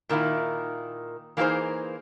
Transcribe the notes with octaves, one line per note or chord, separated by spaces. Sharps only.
A#2 D#3 A#3 E4
E3 A#3 D#4 F4 G#4 C5